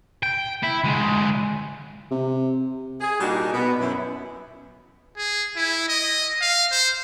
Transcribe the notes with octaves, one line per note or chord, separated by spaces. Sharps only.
G5
E4
D3 G#3
C3
G#4
A#2 G3 D4 D#4 F#4 G4
B2 B3
F#2 E4
G#4
E4
D#5
F5
C5